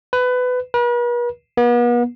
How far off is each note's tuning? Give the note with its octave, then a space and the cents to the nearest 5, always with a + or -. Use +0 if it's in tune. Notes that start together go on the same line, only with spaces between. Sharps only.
B4 +20
B4 -45
B3 -40